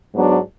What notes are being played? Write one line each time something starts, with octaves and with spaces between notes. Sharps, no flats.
G#2 F#3 B3 D4